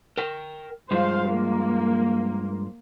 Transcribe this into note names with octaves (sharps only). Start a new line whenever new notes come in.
A#4 G5
G2 F3 G#3 C5 F5
A#3